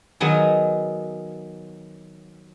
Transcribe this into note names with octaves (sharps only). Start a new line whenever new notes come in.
D#3 F#3 B3 G#4